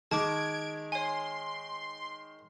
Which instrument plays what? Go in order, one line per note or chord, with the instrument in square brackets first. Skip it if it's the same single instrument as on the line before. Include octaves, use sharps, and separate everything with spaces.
[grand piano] D#3 [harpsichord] G#3 [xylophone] A5 D6 [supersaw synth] G#6 D7
[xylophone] C#5 G#5 [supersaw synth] C6